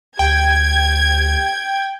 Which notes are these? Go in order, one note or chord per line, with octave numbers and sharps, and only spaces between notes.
D2 G4 G5 G#6